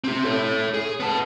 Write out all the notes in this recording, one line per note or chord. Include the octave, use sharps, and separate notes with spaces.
C4 G4
A4 C#5
G#4
B3 A5